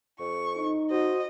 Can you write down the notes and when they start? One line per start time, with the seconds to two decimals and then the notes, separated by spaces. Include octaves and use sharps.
0.20 F2 C#6
0.56 D#4
0.91 F#4 C5 D#5